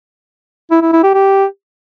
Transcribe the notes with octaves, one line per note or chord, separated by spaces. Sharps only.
E4
E4
E4
G4
G4